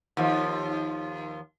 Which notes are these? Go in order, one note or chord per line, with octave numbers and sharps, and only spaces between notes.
D#2 F3